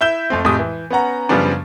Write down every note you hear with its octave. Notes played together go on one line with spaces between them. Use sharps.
E4 E5 G6 E7 G7
F2 A3 C4
F2 A2 G#3 G4 D#6
E3
B3 C#4 F#5 A#5
F#2 C#3 F3 G3 B3 D4